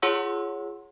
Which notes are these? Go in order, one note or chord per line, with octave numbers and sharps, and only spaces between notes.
F4 G#4 C#5 F#5 C6 E6